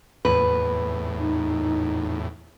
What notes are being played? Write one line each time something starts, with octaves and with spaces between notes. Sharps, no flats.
E2 A2 B4
D#4